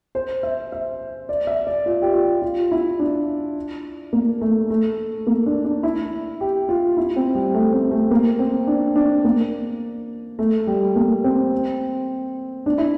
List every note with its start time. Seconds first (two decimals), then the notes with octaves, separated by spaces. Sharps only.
0.15 C5
0.43 E5
0.72 E5
1.29 D5
1.47 E5
1.67 D5
1.86 F4
2.02 G4
2.13 F4
2.42 F4
2.71 E4
2.99 D4
4.13 A#3
4.41 A3
4.70 A3
5.27 A#3
5.46 D4
5.65 D4
5.83 E4
6.41 G4
6.69 F4
6.97 E4
7.16 C4
7.35 G3
7.55 A3
7.73 C4
7.91 A3
8.11 A#3
8.39 C4
8.67 D4
8.96 D4
9.24 A#3
10.39 A3
10.67 G3
10.96 A#3
11.24 C4
12.66 D4
12.78 E4